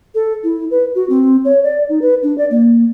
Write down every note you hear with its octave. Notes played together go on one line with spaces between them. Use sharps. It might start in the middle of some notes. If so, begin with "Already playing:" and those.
A4
E4
B4
F#4
C4
C#5
D5
D#4
B4
D4
D5
A#3